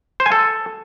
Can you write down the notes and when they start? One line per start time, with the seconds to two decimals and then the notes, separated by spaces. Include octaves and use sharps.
0.20 C5
0.26 G#5
0.32 A4